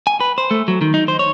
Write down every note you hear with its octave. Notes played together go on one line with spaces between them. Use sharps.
G#5
B4
C5
A3
F#3
D#3
D#4
C5
C#5